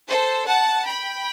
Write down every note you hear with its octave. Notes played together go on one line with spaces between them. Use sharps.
A4 C5
F#5 A5
G5 B5